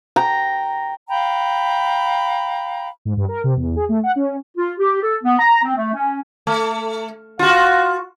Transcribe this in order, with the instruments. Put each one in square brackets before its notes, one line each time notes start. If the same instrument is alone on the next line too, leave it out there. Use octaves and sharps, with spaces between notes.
[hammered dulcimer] G5 A#5
[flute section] F5 G5 A#5 B5
[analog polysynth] G#2
G2
A#4
C3
E2
G#4
A3
F#5
C#4
[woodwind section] F4
G4
A4
B3
A#5
C4
A3
C#4
[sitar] A3
F4 F#4